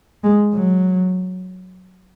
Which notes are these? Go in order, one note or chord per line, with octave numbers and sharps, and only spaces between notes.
G#3
F#3